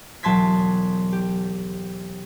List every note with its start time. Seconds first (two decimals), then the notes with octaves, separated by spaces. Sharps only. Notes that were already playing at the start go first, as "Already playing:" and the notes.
0.23 E1 F#3 A5 C6 G#6 B6
1.12 G4